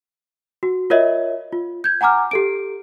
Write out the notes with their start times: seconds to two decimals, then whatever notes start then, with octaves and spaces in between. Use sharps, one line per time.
0.63 F#4
0.90 F4 A#4 C#5 D#5 E5
1.52 F4
1.84 G6 G#6
2.01 F#5 G#5 A#5 D6 F6
2.31 G4 A4 D7